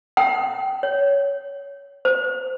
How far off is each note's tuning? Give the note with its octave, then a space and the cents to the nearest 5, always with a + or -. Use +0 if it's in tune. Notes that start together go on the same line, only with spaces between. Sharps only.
G5 -25
C#5 +15
C5 -20